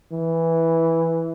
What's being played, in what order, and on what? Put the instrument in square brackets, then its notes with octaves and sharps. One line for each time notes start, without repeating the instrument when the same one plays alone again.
[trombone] E3